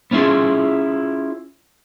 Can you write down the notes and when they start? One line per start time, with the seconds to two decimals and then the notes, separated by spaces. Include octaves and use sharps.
0.11 B3 C#4 E4 F4 G#4